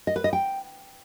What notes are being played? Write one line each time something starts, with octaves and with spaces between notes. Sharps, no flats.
D#5
B4
D#5
G5